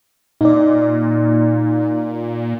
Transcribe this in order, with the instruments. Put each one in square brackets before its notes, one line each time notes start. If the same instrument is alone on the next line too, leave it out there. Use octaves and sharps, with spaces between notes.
[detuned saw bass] A#2 [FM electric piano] D#4 D5